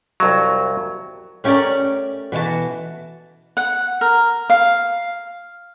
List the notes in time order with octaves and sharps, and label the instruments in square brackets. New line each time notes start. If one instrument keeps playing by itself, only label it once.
[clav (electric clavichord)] C2 F2 F#3
[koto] A3 C#4 G4 A#4 D5 G5
B2 E3 F#4 A5
[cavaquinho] F#5
A#4
F5